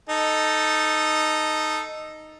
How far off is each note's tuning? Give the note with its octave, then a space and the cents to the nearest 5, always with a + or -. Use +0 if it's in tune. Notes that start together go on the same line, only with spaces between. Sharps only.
D#4 -5 A4 +0